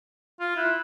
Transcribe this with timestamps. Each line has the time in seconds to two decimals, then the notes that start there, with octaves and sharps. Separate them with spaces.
0.40 F4
0.56 E4 F#6